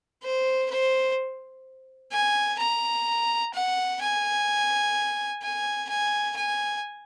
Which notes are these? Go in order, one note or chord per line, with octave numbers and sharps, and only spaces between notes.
C5
C5
G#5
A#5
F#5
G#5
G#5
G#5
G#5